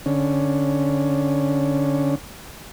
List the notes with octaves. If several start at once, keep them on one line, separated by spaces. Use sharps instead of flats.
D3 C#4